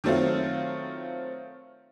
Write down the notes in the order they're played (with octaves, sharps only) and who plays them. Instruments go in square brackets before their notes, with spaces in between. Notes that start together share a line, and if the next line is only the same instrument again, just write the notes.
[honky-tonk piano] D#3 F#3 A3 C4 F4